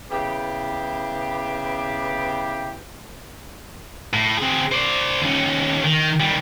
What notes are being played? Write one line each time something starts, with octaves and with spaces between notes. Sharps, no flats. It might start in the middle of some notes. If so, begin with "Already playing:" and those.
C#3 B3 E4 G4
A2
C4 G#4
C5 D5
D#2 C#4
D#3
D#3 G3